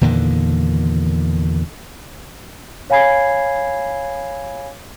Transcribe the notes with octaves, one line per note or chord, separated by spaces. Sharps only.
E2 A#2 D3 D#3
C#5 F5 G#5 B5 G#6 C7